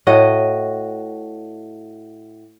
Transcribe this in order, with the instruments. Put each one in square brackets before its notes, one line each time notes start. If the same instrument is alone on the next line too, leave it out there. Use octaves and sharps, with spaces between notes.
[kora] A2 F#4 D#5